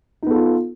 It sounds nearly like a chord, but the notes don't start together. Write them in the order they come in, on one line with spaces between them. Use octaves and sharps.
D#4 B3 A4 F4